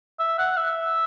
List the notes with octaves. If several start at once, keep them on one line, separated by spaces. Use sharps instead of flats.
E5
F#5
E5